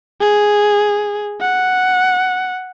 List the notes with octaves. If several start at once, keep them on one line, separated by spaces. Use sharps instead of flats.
G#4
F#5